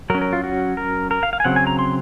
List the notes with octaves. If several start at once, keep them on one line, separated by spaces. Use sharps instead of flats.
F#3 C#4 A#4
A#4
F4
F#4
A#4
A#4
F5
F5
G#5
C#3 F#3 C4 F#5
G#5
A#5
C6